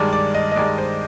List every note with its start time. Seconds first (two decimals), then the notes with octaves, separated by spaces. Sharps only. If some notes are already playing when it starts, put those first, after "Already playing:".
Already playing: G2 D#3 G#3 D5
0.13 D5
0.34 D#5
0.52 D#5
0.56 G2 D#3 G#3 D5
0.78 C5